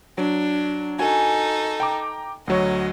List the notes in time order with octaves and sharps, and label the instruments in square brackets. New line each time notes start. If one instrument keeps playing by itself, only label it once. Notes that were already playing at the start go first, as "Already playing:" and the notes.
[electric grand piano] F#3 [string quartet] D4
[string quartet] D#4 A4 [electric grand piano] F#4 [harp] G#5
[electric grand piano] G5 A#5 D6
[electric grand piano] D2 F#3 C#5 [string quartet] D#5